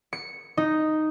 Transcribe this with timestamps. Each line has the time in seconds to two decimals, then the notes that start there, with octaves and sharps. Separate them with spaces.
0.13 C#7
0.57 D#4